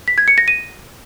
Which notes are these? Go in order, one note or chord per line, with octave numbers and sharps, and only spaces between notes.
B6
G#6
C#7
A#6
D#7